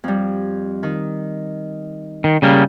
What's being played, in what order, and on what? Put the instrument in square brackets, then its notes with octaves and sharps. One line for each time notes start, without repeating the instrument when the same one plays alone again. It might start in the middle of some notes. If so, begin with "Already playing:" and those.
[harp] F2 G3
D#3
[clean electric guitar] D#3
C#3 G3 A#3